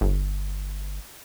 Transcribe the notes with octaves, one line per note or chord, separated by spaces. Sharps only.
G1